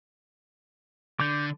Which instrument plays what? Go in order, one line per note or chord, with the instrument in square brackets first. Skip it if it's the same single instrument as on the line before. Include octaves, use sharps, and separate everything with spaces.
[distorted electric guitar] D3 [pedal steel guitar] D6 G6